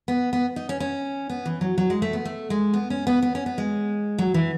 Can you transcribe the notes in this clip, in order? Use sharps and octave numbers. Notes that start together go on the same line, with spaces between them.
B3
B3
D#4
C#4
C#4
B3
E3
F#3
F#3
G#3
A3
B3
A3
G#3
B3
C#4
B3
B3
C#4
B3
G#3
F#3
E3